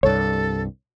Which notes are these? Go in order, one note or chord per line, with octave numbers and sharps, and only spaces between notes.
C2 G2 A4 C#5